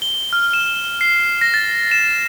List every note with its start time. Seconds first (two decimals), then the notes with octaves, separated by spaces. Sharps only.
0.02 G7
0.33 F6
0.53 E7
1.01 C7
1.41 A#6
1.54 A6
1.91 E7